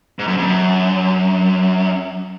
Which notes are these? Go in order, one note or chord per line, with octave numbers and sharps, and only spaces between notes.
G#2
F#2
F2
F#2